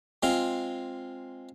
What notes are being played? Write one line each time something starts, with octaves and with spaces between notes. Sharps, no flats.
G#3 C4 F4